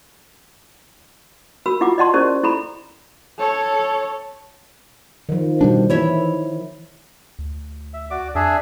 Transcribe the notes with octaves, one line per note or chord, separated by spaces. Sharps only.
F#4 A#4 B5 E6
E4 F4 F#5 D6
D5 D#5 F#5 A5 C6
C#4 E4 G4 A#4 C5 D5
E4 A4 A#5 B5
A4 C#5
D#3 F3
B2 G3 D4
E3 E4 C#5 E5
D2
E5
F#4 D5 D6
F2 D4 G#4 E5